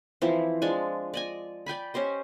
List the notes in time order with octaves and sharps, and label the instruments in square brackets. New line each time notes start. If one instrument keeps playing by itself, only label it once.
[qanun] E3 F3 C4 E4
F3 G#3 D4 G#5
D5 D#5 G#5
D5 G5 G#5 B5
C#4 G4 C5 D#5